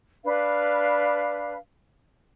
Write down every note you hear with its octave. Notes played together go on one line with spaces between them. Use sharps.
D4 B4 F5